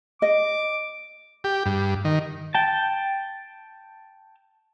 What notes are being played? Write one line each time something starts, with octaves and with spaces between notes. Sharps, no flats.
D#5 D6
G4
G2
D#3
G5 A5